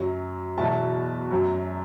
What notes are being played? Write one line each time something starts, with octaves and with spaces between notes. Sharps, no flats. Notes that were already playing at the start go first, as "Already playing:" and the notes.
Already playing: F#2 F#3
E2 B2 F#3 E5 A5
F#2 F#3